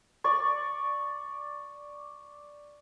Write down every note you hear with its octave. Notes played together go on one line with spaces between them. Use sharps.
D5 C#6